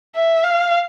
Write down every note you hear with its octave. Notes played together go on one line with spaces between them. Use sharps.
E5
F5